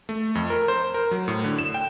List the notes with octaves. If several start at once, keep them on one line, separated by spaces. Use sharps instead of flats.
A3
F2
A#4
C5
A#4
F#3
A2
D3
E7
G5